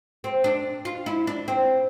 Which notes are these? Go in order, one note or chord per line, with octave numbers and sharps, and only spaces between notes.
C4
D4
F4
E4
D4
C4